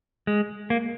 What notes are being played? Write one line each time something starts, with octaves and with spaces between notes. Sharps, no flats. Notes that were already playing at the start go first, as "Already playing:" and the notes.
G#3
A#3